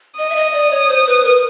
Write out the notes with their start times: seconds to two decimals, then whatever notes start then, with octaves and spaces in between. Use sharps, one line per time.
0.18 D#5 D#6
0.30 E5
0.36 D#5
0.53 D5
0.71 C#5
0.89 C5
1.07 B4
1.25 A#4